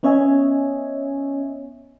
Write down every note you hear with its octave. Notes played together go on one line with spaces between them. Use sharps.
B3 C#4 C#5 D#5 E5 G#5